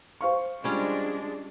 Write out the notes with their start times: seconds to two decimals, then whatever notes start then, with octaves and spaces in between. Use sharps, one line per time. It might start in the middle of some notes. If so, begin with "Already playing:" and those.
0.21 C5 F5 C#6
0.64 G3 G#3 C#4 D4 F4